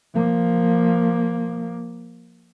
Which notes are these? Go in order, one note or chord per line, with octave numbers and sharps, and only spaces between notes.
F3 A#3